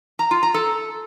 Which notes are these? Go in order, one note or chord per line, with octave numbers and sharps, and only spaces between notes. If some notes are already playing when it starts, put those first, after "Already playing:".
A#5
F4
A#5
A4